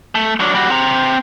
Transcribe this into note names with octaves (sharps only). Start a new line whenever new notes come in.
A3
F#3 D4
G3 F#4
C4 A#5